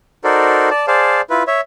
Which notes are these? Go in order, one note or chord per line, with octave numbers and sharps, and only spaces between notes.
D#4 F#4 A4 A#4 C5 D5
D5 A5
G#4 C5 D5 F5 A5
E4 F4 B4
C#5 E5